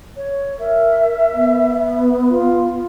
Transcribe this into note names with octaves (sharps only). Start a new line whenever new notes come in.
C#5
A#4 E5
B3
F4